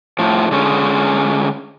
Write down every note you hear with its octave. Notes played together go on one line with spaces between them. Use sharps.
A2 F3
D3 G#3 C#4